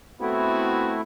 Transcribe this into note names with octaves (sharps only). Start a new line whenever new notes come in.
A3 B3 C4 E4 F#4